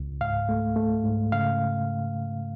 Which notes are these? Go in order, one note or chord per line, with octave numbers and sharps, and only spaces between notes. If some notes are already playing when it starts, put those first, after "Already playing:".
Already playing: C#2
G#2 F5
A3
A3
G#2
C#3 F5